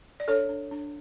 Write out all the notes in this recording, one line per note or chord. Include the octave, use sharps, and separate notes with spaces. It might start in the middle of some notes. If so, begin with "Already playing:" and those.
D5
D4 A4 C#5
D4
D4